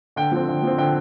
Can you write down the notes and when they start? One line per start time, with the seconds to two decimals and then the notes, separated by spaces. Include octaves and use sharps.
0.16 D3 G5
0.31 F3 C4
0.48 D3
0.63 F3 C4
0.78 D3 G5